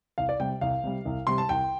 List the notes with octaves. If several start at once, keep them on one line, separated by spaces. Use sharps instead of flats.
C2 F5
D5
C3 G3 G5
C2 F5
C3 G3
C2
C3 G3 C6
A5
C2 G5